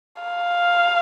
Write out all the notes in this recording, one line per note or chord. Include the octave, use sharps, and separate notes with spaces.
F5